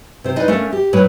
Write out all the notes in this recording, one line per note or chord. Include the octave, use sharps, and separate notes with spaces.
C3 C5
D#4 E4 B4 C5 D5 D#5
A3 A#3 C#4 D4 A#4
G4
A2 F#3 E4 B4